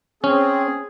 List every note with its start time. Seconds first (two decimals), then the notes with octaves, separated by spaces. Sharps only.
0.24 C4 C#4 G#4